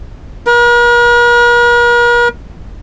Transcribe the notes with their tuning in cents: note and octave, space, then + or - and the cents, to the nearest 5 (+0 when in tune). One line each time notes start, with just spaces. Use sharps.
A#4 +45